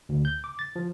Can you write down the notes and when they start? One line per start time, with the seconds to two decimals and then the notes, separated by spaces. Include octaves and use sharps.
0.09 D2
0.25 G6
0.44 D6
0.59 A6
0.76 F3